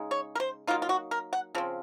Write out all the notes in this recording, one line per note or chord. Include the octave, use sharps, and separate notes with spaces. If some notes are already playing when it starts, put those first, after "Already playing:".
Already playing: C#3 G#3 D#4
C#5
A#4
C5
F#3 A#3 D#4 F4
F4
F#4
A#4
F#5
C#3 F3 C4